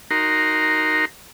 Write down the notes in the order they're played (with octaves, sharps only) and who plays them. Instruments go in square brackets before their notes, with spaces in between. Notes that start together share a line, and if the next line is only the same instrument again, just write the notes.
[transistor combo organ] D#4 F#4 A#4 A#5 C6